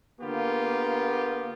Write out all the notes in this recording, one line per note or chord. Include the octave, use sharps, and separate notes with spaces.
D3 A#3 B3 F4 G4